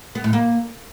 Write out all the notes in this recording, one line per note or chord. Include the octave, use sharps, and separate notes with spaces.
B3
A2
A#3